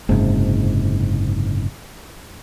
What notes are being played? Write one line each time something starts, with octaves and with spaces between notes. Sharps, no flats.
F#1 G#2 C3